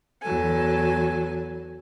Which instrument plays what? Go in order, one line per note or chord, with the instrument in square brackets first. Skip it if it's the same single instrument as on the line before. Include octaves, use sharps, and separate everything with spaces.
[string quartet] E2 F#3 A4 G#5